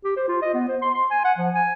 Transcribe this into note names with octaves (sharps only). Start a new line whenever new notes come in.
G4
C5
F4
D#5
B3
C5
C6
C6
G#5
F#5
F3
G#5